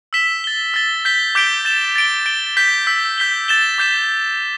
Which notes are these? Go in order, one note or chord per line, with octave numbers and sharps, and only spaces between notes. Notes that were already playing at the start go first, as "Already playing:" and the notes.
E6 B6 E7 G7
A6 G7
E6 A6 G7
G6 B6 G7
D6 G6 B6 D7 G7
A6 E7 G7
A6 D7 G7
A6 D7 G7
G6 B6 G7
E6 G6 B6
G6 B6 G7
A6 E7 G7
D6 G6 B6 E7